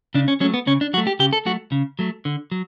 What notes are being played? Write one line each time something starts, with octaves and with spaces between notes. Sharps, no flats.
C#3 D4
C#4
F#3 A3 C#4
B3
C#3 C#4
D4
F#3 A3 F#4
G4
C#3 G4
A4
F#3 A3 F#4
C#3
F#3 A3
D3
F#3